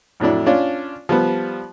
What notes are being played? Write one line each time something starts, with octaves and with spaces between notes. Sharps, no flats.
F2 A2 F#3 D4 E4
C#4 D4 F4
F3 G3 B3